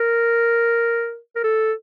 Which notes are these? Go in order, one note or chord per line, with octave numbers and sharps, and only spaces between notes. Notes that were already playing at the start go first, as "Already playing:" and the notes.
Already playing: A#4
A#4
A4